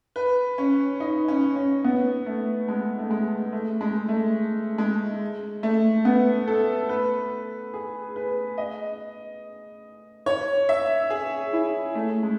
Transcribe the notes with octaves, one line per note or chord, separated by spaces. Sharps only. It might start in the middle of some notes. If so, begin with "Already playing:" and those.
B4
C#4
D#4
C#4
C#4
B3
A3
G#3
A3
G#3
A3
G#3
A3
G#3
A3
B3
A4
B4
G#4
B4
D#5
C#5
E5
G#4
E4
A3
G#3